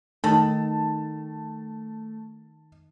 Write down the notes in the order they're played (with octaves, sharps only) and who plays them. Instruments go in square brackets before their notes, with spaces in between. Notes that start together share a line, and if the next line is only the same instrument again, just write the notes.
[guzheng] D#3 [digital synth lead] A3 [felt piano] A5